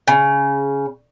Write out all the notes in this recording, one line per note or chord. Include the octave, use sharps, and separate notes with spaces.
C#3